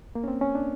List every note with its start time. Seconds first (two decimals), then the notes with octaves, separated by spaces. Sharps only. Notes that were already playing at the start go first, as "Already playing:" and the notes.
0.15 A#3
0.24 C#4
0.28 C4
0.41 C#4
0.55 D4